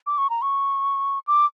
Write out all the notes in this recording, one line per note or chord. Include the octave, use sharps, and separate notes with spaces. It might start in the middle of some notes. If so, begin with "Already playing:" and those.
D6
C#6
A#5
C#6
D6